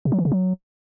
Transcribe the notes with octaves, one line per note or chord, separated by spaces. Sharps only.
C3
F#3
E3
C#3
F#3